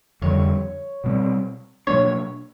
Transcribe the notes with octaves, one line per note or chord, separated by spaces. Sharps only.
F2 D3 G3 C#5
B2 G3 C4
B2 F#3 A#3 D4 C#5